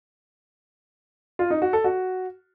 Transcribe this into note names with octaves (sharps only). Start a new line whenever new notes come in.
F4
D#4
F#4
A4
F#4